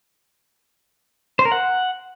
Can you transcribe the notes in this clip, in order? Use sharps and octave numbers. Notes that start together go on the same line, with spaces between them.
C5
A#4
F#5